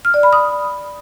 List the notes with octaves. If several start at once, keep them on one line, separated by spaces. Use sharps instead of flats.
F6
D5
B5
D#6